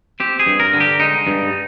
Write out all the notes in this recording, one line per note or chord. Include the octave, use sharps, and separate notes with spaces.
C4 G4
G#4
G2
A#4
D3
G4
G#3 D#4
G2